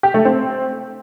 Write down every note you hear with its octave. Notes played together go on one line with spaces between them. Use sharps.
G4
A3
C4